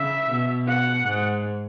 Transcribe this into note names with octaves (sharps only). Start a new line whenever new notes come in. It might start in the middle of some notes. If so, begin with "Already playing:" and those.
Already playing: C#3 E5
B2
F#5
G#2